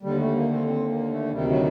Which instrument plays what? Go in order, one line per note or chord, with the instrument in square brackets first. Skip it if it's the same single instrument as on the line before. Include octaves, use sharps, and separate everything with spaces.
[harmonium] D#2 D3 G3
A3
A#3
C4
C4
A#3
A3
D2 C3 D#3 G3
F#3